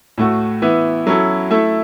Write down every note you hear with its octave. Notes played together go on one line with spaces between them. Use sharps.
A2 A3 F#4
E3 B3 E4
F#3 C#4 E4 A4
A3 E4 A4